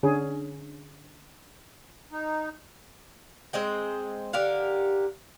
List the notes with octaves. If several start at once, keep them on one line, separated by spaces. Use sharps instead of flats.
D3 C#4 G#4
D#4
G#3 C4 D#5 G5
D3 G4 A#4 F5